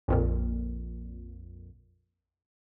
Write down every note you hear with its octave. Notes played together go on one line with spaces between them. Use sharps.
A#1 F2 A#2